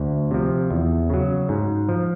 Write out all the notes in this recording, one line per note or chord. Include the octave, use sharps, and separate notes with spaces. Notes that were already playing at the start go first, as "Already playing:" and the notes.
Already playing: D2
C3 F3
E2
C#3 F#3
G#2
F3